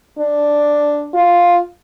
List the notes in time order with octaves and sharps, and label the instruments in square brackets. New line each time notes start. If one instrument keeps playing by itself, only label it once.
[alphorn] D4
F4